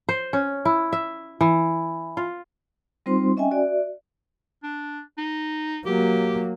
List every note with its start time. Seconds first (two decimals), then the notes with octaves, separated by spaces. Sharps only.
0.09 C5
0.33 C#4
0.65 E4
0.93 E5
1.41 E3
2.17 F4
3.06 G3 C4 D#4 F4 C5 C6
3.37 C#4 D#5 E5 G5 G#5
3.51 F#4 D5 E5
4.63 D4
5.18 D#4
5.86 F#3 A#3 G4